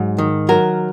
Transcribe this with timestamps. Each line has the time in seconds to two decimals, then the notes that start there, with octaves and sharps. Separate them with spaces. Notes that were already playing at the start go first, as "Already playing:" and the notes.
Already playing: G#2 F#3
0.18 D#3
0.49 F#3 A#4